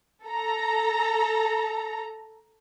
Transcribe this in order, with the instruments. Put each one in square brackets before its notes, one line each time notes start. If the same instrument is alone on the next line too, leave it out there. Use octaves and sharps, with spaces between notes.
[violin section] A4 A#5